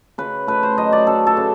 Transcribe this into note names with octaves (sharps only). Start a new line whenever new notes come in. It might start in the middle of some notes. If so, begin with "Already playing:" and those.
C#3 B4
A3 B4
C5
F#3 D#5
D5
C#3 A4
A4
C#3